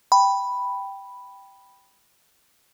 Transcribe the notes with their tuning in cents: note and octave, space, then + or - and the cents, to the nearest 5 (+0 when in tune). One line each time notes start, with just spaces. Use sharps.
G5 +0 B5 +0